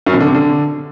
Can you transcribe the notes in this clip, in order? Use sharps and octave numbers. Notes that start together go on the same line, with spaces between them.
F#2
B2
D3
C3
D3